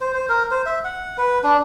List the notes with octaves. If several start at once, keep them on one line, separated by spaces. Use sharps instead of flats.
C5
C5
A#4
C5
E5
F#5
B4
D4